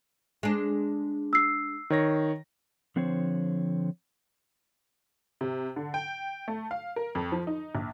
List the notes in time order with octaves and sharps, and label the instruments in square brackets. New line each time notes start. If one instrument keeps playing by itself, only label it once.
[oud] G#3 D4
[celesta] E6 C7
[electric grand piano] D#3 C#5 A#6
[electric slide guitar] D3 F3 C4 C5 C#5
[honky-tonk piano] C3
D3
G5
A3
F5
A#4
F2
F3
D#4
A#1